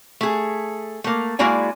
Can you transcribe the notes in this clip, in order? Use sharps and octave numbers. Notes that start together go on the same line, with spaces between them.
A3 G#4
A3 A#3
G#3 A#3 E4 F#4 D5 G#5